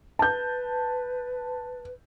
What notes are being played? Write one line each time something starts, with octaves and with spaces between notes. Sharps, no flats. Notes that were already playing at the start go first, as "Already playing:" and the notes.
B4 A5 G6